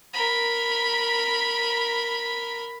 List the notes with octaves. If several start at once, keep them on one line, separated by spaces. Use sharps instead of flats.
A#4 B5